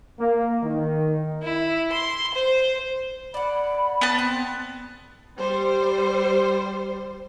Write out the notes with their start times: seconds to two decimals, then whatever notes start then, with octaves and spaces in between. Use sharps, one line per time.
0.20 A#3
0.63 D#3
1.42 E4
1.92 C6
2.34 C5
3.34 D5 F#5 B5
4.01 B3 A5
4.19 C4
5.39 G3 C5